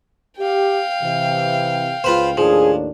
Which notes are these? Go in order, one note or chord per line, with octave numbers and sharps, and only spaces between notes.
G4 F5 G5
C3 E3
C#2 F4 B4 C5
D#2 A2 F3 D4 G#4